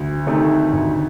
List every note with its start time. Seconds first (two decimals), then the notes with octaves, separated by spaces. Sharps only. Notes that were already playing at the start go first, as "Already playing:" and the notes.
Already playing: D2
0.26 C3 D#3 A3 D#4
0.73 D2